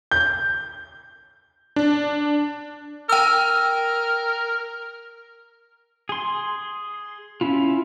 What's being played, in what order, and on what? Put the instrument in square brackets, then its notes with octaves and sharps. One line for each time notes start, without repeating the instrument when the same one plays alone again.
[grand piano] G6
[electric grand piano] D4
[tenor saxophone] A#4 [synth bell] G5 E6
[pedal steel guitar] G#4 C6
C#4 E4 F4